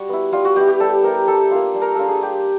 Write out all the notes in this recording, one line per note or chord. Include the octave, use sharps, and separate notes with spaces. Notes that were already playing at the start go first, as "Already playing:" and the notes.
Already playing: G3 F#4
B3 E4
G3 F4
F#4
B3 E4 G4
G4
G3 A4
B3 E4 A#4
G3 A4
A#3 D4 F4
G3
A#4
A#3 D4 F4 A4
G#4
G3 G4